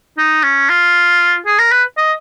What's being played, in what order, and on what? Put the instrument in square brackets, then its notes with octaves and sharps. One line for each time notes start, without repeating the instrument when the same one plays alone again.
[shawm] D#4
C#4
F4
G#4
A#4
B4
D#5